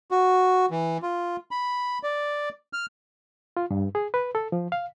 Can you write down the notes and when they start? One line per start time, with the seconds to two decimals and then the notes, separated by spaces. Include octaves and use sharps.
0.11 F#4
0.71 E3
1.02 F4
1.51 B5
2.03 D5
2.73 F6
3.57 F4
3.71 G2
3.95 G#4
4.14 B4
4.35 A4
4.52 F3
4.72 F5